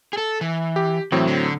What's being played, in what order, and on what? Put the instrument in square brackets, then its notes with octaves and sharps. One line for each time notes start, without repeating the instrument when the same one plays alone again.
[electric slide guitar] G#4 A4
E3
[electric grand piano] G4
[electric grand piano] A2 F#3 C4 [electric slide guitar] E3
[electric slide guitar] D3